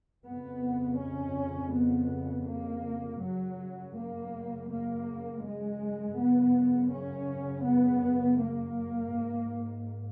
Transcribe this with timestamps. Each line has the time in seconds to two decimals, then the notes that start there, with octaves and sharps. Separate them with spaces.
0.25 F2 C#3 B3
0.99 C#4
1.73 B3
2.47 A#3
3.21 F#2 C#3 F#3
3.95 A#3
4.69 A#3
5.43 G#3
6.16 F#2 C#3 B3
6.91 C#4
7.65 B3
8.39 A#3
9.13 G#2